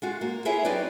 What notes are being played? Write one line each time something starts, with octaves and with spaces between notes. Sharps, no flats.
G#3 F4 F#4
A#3
E4 F4 G#4 C#5 E5
F#3 C4 D#4 B4 D5